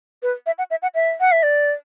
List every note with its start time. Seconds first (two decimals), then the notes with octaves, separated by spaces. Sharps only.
0.23 B4
0.46 E5
0.58 F#5
0.70 E5
0.82 F#5
0.95 E5
1.20 F#5
1.32 E5
1.43 D5